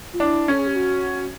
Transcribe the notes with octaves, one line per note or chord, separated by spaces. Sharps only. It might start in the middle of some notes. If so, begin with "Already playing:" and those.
F4
D4 E4
C#4 A4
G#4
G4
F#4